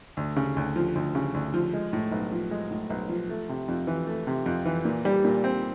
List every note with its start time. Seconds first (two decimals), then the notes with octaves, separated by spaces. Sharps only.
0.17 D2
0.36 C#3
0.56 D2
0.76 F3
0.95 D2
1.15 C#3
1.34 D2
1.54 F3
1.73 G#3
1.93 A2
2.12 B1
2.32 F3
2.51 G#3
2.71 A2
2.90 B1
3.09 F3
3.29 A3
3.49 C3
3.68 F2
3.87 E3
4.07 A3
4.27 C3
4.46 F2
4.65 E3
4.85 A#2
5.05 G3
5.24 A#2
5.44 C4